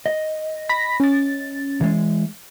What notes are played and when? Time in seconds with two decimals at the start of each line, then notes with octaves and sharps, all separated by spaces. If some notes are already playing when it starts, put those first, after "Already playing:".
0.06 D#5
0.69 B5 A#6 B6
1.00 C#4 A6
1.81 E3 G#3